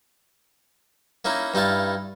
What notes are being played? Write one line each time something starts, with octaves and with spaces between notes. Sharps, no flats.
A#3 C#4 D#4 E4
G2 D#4 E4 F5 A5